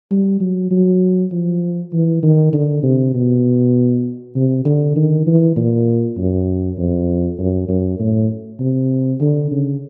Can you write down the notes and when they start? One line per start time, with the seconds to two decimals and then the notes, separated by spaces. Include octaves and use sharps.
0.11 G3
0.40 F#3
0.71 F#3
1.32 F3
1.93 E3
2.23 D#3
2.53 D3
2.83 C3
3.14 B2
4.35 C3
4.65 D3
4.96 D#3
5.27 E3
5.56 A#2
6.17 F#2
6.78 F2
7.39 F#2
7.69 F#2
8.00 A2
8.60 C3
9.21 D3
9.51 C#3